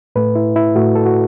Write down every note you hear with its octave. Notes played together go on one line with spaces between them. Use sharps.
A2 A3 B4
E4
E4
A2 A3 F#4
A4
F#4